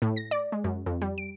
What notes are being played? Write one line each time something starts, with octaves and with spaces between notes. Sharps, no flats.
A2
A#6
D5
G#3
F#2
F2
G3
D7